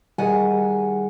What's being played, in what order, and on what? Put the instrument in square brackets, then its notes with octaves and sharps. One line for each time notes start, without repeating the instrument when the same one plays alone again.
[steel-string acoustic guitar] D#3 F#5 G#5 [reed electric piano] G3 G#4